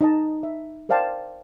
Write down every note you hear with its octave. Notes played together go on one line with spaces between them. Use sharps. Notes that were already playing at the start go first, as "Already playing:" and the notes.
D#4 D#5 A5
E5
A#4 C5 D5 F5 G5 A5